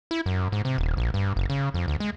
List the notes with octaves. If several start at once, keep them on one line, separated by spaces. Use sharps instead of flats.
E4
F#2
G#2
C3
D#1
A#1
G2
F#1
C#3
F2
D2
G#3